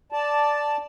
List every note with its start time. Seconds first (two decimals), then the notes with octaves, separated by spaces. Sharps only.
0.12 D5 A5